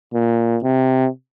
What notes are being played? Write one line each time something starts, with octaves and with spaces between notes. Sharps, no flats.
A#2
C3